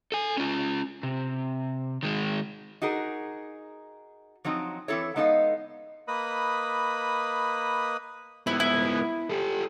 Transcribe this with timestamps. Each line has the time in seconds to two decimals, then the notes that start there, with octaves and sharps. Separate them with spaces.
0.12 A4 G#5
0.37 C#4 F4
1.03 C3
2.03 D#3 G#3
2.82 D#4 F#4 G#4 A#4
4.45 F3 F#3 C4 D#4
4.88 E3 C4 E4 A4 C#5
5.16 G#3 B3 D#4 A4 D#5 F5
6.08 A#3 B4 D#5 B5 D#6
8.47 G#2 B3 E4
8.60 E4
9.30 G4 A4